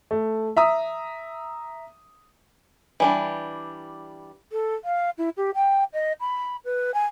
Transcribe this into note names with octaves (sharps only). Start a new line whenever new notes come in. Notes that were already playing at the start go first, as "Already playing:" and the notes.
A3
E5 A#5 D#6
E3 G3 D4
A4
F5
E4
G4
G5
D#5
B5
B4
G#5